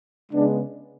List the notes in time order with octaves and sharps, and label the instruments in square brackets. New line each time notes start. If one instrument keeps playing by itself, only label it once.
[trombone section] C#3 G#3 B3 D4